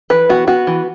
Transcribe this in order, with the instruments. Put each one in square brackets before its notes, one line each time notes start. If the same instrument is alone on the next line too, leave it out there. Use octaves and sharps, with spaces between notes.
[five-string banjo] E3 B4
B3 F#4
B3 F#4
E3